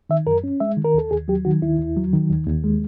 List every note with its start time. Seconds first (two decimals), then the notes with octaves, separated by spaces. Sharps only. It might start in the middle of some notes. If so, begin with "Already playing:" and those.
0.09 D#3 E5
0.26 F#2 A#4
0.44 C#4
0.60 G#3 E5
0.77 D#3
0.84 A#4
0.94 D#2 A4
1.11 D#2 G#4
1.28 F#3 G4
1.45 D#3 F#4
1.62 D#2 E4
1.79 D#2
1.97 F#3
2.13 D#3
2.30 D#2
2.47 D#2
2.64 G#3